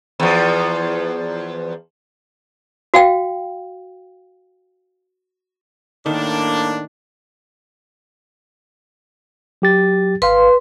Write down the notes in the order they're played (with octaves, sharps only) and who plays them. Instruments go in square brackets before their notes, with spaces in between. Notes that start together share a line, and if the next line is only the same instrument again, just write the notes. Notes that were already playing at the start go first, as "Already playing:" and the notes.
[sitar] E2 F3
[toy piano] F#4 F5 G5
[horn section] A2 A#3 D4 [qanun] D#3
[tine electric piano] F#3 G4 A6
[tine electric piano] G#1 F5 [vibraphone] B4 C6